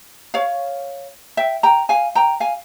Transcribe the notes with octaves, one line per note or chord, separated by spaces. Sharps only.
C#5 F5
E5 G5
G5 A#5
F5 G#5
G5 A#5
F5 G#5